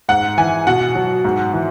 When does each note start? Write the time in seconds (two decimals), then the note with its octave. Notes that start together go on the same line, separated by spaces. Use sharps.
0.09 G#2 F#5
0.37 E3 G#5
0.67 B2 F#5
0.95 F#3
1.24 G#2
1.53 E3